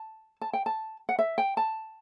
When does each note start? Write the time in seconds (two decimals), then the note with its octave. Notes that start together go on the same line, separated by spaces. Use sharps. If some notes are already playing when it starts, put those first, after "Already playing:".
Already playing: A5
0.41 A5
0.53 G5
0.66 A5
1.09 F#5
1.19 E5
1.38 G5
1.57 A5